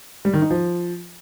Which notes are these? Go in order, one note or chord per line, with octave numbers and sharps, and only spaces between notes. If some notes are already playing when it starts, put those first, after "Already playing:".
G3
D#3
D#4
F3